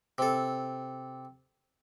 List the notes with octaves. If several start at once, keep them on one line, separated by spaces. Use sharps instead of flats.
C3 A4